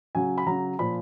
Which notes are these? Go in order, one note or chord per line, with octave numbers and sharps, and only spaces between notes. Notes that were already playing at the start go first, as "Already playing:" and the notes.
C#3 F#3 G#5
B5
C#3 F#3 A#5
A#2 F3 B5